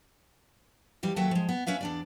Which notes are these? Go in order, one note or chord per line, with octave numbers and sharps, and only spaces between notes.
F2 E3 G3
D#2 F#3 A4 B4 E5 G5
F3 G#3
B3
C#4 B4 E5 F5
E2 D4 D5